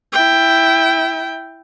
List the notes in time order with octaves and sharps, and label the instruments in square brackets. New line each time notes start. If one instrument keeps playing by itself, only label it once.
[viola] E4 G5